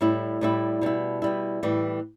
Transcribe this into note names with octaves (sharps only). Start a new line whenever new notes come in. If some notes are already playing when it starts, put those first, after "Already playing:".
A2 G3 E4
A2 G3 E4
B2 G3 E4
B2 G3 E4
A2 E3 G3